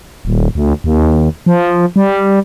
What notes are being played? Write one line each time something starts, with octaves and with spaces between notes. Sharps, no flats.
D#1
D2
D#2
F3
G3